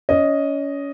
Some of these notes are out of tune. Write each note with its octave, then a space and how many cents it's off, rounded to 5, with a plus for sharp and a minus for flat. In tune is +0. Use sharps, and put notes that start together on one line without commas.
C#4 +25 D#5 +0